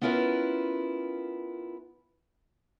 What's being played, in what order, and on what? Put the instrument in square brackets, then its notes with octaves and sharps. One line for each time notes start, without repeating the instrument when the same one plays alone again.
[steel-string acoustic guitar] B3 C#4 E4 F4 A#4 B4